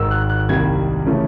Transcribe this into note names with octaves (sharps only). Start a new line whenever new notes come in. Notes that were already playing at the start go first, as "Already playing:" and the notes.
Already playing: G#1 G#2 D#3 E6
F#6
F#6
C2 C3 D#3 G3 A#3 G#6
C#3 E3 A3 C#4